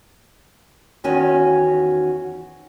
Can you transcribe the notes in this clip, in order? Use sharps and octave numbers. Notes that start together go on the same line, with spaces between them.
E2 D#3 C#4 F#4 G#5